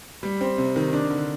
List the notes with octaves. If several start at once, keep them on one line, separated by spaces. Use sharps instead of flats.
G3
C4
C3
D#3
D4
D3